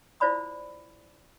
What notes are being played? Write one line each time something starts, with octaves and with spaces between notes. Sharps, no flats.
E4 F4 C5 D5 B5 D#6